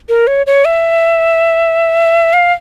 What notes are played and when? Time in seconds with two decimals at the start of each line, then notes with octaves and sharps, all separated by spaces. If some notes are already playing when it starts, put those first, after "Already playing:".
0.09 A#4
0.27 C#5
0.47 C#5
0.65 E5
2.33 F5